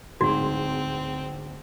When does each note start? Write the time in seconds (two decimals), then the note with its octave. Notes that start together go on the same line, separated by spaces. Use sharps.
0.21 D1 G#2 C4 F#4